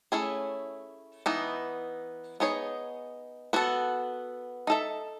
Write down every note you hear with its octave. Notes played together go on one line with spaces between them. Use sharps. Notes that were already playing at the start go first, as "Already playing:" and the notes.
A3 C#4 E4 G#4
E3 B3 D#4
B3 D#4 G#4 C#5
B3 F#4 A4
D#4 A4 E5